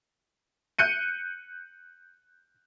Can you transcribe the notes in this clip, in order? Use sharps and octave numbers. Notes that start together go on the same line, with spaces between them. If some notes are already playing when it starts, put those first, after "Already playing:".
F#6 G6 C#7 D#7